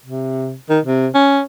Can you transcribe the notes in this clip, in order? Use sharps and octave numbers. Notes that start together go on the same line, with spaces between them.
C3
D#3
C3
C#4